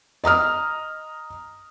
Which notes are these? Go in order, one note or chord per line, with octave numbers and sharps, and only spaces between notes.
D#5 A#5 D#6 F6